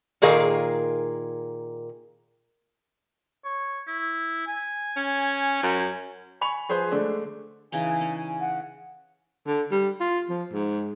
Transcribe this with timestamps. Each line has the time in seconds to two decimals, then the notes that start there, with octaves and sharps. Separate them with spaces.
0.22 A#2 D#3 G#4 A#4 F5
3.45 C#5
3.87 E4
4.48 G#5
4.97 C#4
5.63 F#2
6.41 G#5 B5 C#6 F7
6.69 F3 G#4 B4 C5
6.91 D3 G#3 A3 D4
7.72 C#3 E3 D#4 G#5
8.01 C#4
8.40 F#5
9.47 D3
9.71 G3
10.00 F4
10.29 F3
10.53 G#2